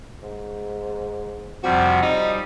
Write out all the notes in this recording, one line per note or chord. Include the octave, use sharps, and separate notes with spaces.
G#2
F2 C3 F3 G3 F#4
G3 D#4